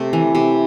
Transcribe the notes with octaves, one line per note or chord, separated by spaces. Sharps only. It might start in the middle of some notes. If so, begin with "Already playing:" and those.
Already playing: C3 A3
E3
C3